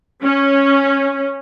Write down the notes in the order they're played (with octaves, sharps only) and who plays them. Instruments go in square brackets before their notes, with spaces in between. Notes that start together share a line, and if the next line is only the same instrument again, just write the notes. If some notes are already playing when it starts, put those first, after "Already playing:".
[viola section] C#4